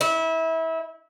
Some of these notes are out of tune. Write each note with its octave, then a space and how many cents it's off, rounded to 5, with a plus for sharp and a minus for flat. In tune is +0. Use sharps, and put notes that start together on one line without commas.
E4 -25